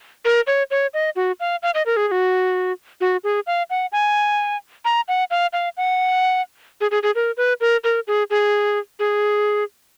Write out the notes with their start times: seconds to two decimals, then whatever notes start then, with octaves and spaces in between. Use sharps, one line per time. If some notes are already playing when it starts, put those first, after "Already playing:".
0.25 A#4
0.47 C#5
0.71 C#5
0.94 D#5
1.16 F#4
1.40 F5
1.63 F5
1.74 D#5
1.86 A#4
1.97 G#4
2.08 G#4
2.11 F#4
3.01 F#4
3.24 G#4
3.47 F5
3.70 F#5
3.92 G#5
4.85 A#5
5.08 F#5
5.31 F5
5.53 F5
5.77 F#5
6.81 G#4
6.91 G#4
7.03 G#4
7.15 A#4
7.37 B4
7.61 A#4
7.84 A#4
8.07 G#4
8.30 G#4
8.99 G#4